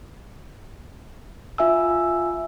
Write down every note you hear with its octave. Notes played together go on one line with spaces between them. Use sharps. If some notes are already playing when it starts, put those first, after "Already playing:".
F4 E5 G#5 E6